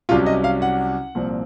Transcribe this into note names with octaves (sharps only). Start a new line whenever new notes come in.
C2 C3 F#3 C#4 F4
D#5
F5
F#5
C2 A#2 F3 C4